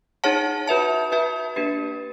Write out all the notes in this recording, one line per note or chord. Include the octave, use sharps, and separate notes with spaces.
D#4 G#4 C#5 F#5 A5
F#4 B4 E5 A5
F#4 B4 E5 A5
A#3 D4 G4 B4